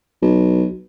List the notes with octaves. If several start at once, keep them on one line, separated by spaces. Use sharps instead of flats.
B1